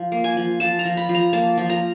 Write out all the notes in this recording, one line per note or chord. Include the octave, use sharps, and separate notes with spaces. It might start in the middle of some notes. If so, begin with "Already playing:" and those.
Already playing: F3
A#3
G#5
F3
F3 A5
A#5
F3
B5
F3
A#5
A#3 A5
F3
A#5